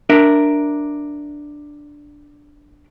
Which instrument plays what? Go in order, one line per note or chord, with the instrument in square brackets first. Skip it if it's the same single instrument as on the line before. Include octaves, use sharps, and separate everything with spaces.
[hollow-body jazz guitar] D4 A#4 E5